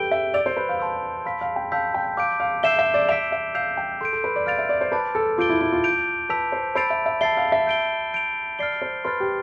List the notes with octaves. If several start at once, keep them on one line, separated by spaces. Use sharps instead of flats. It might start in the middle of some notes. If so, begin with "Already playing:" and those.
Already playing: G4 A4 B4 G5 G6 D7 G7
E5
D5 E6 A6 D7 F7
C5
B4
F5
A5 C6 E6
F5 B5 E6 B6
F5
G5
F5 A5 E6 G6 B6
G5
F5 D6 G6 D7
F5
E5 E6 G6 C7 E7 G7
E5
D5
E5 E6 B6 D7 F7
E5
F5 E6 G6 C7 F7
G5
A4 C6 G6 D7
A4
B4
D5
F5 F6 A6 D7 F7
E5
D5
C5
B4 A5 D6 A6
A4
F4 D6 G6 D7 G7
E4
E4
F4
G6 D7 F7
B4 A5 E6 B6 F7
C5
C5 B5 E6 A6 D7 F7
E5
E5
E5 A5 E6 A6 C7 G7
F5
E5
G6 D7 G7
G6 D7 F7
D5 F6 A6 C7 G7
C5
B4 C6 F6 A6
G4